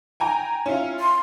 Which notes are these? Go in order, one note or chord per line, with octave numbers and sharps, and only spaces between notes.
G5 G#5 A#5
C#4 E4 F4
C6